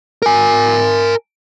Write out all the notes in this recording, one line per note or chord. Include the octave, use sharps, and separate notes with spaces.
A#4 G#5